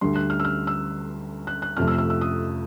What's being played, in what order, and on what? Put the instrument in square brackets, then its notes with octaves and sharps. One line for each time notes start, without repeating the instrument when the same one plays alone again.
[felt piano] D2 D3 G3 C6
F#6
F6
E6
F6
E6
F#6
F#6
F2 C3 F3 A3 F6
E6
E6
E6
D#6